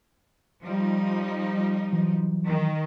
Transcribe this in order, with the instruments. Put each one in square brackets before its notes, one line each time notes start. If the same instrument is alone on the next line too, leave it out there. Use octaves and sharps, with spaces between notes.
[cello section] F3 G3 D#4
[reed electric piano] E3 F#3
[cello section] D#3